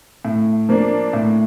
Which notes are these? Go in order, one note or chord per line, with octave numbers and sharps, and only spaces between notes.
A2
F3 A#3 D4
A2